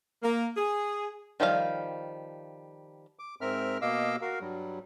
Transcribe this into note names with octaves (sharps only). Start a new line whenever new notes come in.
A#3
G#4
D#3 F3 G3 F5
D6
G#2 C4 A#4 E5 F6
B2 A#3 D#5 F5 D6 E6
F#4 A#4 F5
G2 F#3 G3